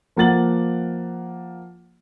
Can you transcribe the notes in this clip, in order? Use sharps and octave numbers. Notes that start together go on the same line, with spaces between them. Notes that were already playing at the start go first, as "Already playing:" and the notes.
F3 A#3 F#5 A6 F#7